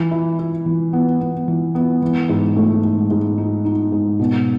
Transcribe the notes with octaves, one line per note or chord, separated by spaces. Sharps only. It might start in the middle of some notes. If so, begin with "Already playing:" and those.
Already playing: E3
E4
E4
E3
B3
B3
E3
B3
E3
G#2
A3
G#2
G#2
D#4
D#4
G#2
B2